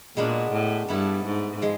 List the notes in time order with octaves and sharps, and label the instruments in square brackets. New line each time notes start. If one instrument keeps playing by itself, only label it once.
[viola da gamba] A#2 [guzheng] G#3 B3 D4 F#4 A#4
[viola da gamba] A2
[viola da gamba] G2 [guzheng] B3 E4 A4
[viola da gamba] G#2
[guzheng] F3 G#3